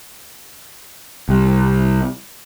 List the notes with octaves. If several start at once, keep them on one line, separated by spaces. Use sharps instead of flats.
C2